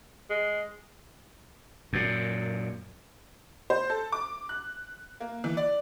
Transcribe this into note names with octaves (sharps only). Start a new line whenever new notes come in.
G#3
F#2 A#2
C5
A4
D6
F#6
A#3
E3
D5